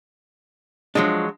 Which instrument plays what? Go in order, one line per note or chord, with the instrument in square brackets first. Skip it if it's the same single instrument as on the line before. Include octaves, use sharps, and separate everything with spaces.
[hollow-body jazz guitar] F3 D4 [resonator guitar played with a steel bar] F#3 G#3